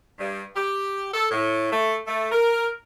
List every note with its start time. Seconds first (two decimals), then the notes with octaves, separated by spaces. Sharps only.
0.18 G2
0.54 G4
1.13 A4
1.30 A2
1.71 A3
2.06 A3
2.32 A#4